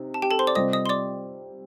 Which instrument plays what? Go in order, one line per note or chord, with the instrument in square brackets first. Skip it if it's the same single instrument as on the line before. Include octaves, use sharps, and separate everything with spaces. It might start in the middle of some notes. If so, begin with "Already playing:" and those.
Already playing: [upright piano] C3 D#4
[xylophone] A5
G4 G5
A4 A5
C5 C6
D5 D6
[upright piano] C3 G3 C4 F4 [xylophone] D#5 D#6
[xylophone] D#5 D#6
C6
D5 D6